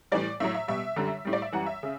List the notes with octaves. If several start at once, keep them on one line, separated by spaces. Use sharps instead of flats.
A2 E3 G3 D5
A2 F#3 E5
E5
B2 G3 E5
F#2 D3 G3
A2 G3
D5
E5
F#2 E3 G3 F#5
E5
C#3